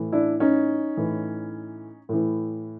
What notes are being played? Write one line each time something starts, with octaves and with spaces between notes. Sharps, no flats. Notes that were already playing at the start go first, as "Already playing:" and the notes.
Already playing: A2 E3
D4 E4
C#4 D#4
A2 E3
A2 E3